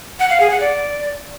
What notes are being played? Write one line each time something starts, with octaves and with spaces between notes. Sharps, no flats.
F#5
F5
G#4
F#5
D5